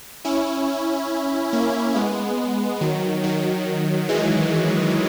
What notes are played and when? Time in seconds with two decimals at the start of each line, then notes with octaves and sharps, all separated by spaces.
0.25 C#4 E4
1.53 A#3 C#4
1.96 G#3 B3
2.81 D#3 F#3
3.24 D#3 F#3
4.09 E3 G#3